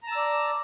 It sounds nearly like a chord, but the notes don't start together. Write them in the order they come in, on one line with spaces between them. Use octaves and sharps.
A#5 A5 E6 D5